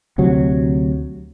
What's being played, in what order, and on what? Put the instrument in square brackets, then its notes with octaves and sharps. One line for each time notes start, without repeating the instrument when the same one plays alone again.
[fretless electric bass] D2 C3 F#3